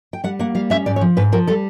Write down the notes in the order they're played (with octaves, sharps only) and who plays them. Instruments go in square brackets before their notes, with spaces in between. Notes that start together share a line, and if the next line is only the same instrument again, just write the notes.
[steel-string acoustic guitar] G5
G3 F#5
A#3 F#5
G3 F5
C#4 E5
G#2 D5
C#5
F3
G#2 B4
F3 A#4
G3 A4